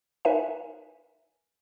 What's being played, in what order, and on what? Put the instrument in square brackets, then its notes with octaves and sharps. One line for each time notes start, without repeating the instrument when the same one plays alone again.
[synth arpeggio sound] D#4 A#4 B4 E5 G#5